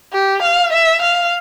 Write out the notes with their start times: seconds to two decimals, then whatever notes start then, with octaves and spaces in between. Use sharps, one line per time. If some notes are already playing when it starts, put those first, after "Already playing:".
0.13 G4
0.42 F5
0.73 E5
1.02 F5